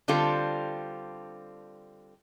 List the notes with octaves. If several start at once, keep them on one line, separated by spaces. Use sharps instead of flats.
D3 G3 C4 F4 A4